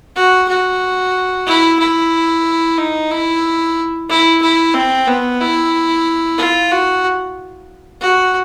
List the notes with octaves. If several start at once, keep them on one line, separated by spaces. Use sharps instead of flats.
F#4
F#4
E4
E4
D#4
E4
E4
E4
C4
B3
E4
F4
F#4
F#4